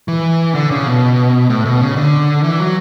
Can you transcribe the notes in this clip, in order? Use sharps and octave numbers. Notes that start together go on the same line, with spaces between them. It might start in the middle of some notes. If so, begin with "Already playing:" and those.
E3
D3
C#3
B2
A2
B2
C#3
D3
E3
F#3